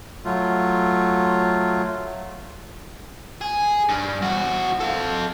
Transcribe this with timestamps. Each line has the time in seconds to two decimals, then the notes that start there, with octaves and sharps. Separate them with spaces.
0.25 F#3 A3 F4
3.41 G#4
3.89 G2
4.22 E2 F#4
4.80 A4 F5